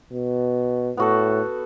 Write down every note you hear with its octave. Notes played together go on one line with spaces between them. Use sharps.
B2
A2 B3 F#4 A4